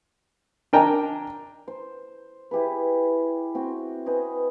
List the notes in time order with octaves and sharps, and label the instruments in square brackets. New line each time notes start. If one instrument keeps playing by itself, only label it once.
[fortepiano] D4 A#4 G5 G#5 A#5
[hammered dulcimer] C5
E4 G4 G#4 B4
C4 F#4 C6
B4 C5 D#5 G#5